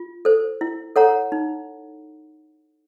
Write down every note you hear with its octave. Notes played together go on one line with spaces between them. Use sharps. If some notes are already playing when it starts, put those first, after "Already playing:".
Already playing: F4
A4 C5
E4
A4 C#5 F#5 A#5
D#4